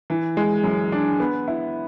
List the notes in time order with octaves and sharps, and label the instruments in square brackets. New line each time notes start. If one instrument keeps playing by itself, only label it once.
[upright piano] E3
G#3
F#2
D4
B3
E4